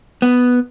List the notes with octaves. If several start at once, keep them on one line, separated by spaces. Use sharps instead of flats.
B3